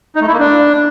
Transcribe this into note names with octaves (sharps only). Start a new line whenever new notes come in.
D#4
A3
E4
A#3
D4